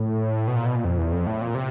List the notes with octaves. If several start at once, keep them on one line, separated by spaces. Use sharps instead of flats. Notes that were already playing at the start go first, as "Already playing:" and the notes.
Already playing: A2
B2
A#2
B2
A#2
F2
E2
F2
A2
A#2
C3